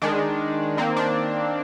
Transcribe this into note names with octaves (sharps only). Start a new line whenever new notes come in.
D#3 G#3 D4
D#3 A#3 C4
D4